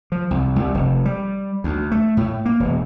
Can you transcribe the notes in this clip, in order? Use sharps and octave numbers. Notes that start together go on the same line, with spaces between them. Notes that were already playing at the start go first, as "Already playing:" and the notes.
F3
C2
C2
F1
G3
D2
A3
A2
A#3
E1